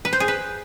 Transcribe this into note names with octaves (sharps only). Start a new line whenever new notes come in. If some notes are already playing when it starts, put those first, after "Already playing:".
B4
C5
G#4
B4